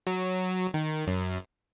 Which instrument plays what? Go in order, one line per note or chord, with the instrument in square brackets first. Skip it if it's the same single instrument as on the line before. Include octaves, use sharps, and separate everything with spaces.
[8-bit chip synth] F#3
D#3
F#2